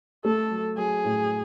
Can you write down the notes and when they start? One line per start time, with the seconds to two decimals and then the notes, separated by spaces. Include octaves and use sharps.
0.25 A3 A4
0.51 F#3
0.77 F#3 G#4
1.05 A2